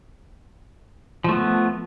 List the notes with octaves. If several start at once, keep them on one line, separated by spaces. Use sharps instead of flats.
F3 A3 B3